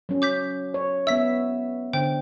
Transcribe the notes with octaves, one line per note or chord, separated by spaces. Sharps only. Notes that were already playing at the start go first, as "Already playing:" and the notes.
F#3 C#4
D6 G6 B6
C#5
B3 E5 E6 B6
D3 C5 G5